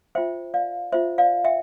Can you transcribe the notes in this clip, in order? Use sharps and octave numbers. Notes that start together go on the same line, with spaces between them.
F4 C5 E5 G5
D5 F5
F4 C5 E5
D5 F5
E5 G5